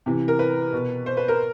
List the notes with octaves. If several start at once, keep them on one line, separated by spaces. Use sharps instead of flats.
C3 E3
A#4
B4
B2
C5
B4
A#4